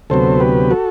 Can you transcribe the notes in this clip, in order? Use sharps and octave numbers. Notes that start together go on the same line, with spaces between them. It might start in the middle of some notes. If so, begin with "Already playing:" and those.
D2 C3 F#3 B3 A4 C5
G4 B4
F#4 A4